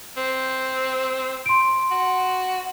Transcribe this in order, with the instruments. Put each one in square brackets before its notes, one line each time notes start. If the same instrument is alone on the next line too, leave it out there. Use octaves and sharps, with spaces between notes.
[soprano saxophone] C4
[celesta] C6 D7
[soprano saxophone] F#4